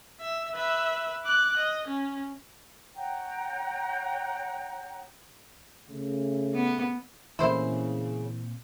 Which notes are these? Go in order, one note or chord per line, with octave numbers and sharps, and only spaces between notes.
E5
B4 E5
D6 F#6
D#5
C#4
C#5 F#5 G5 A#5
C#3 A3
B3
A#2 C#3 E3 A3 A#3 C4 E4 C5